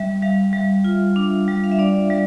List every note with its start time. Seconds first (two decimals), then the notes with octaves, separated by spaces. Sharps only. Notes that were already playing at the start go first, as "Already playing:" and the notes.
Already playing: G3 E5
0.22 G3 F5
0.53 G3
0.84 F4
1.16 D4
1.48 G3
1.64 F5
1.72 E5
1.79 D4 D5
2.10 G3